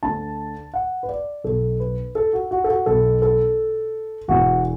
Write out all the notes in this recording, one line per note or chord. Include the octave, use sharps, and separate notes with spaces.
D2 D3 A5
F#5
B4
D5
B1 B2 A4
B4
A4
F#4
F#4
A4
F#4
B1 B2 A4
A4
E1 E2 E3 F#4